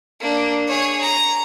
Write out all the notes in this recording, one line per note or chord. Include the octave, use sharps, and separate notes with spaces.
A#3 D4
G#4 C#5
A#5